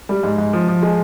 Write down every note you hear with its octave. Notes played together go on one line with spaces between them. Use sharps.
G3
G#2
G#2
F3
F3
G#3